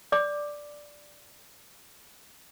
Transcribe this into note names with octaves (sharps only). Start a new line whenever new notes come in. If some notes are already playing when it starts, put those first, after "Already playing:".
D5 D6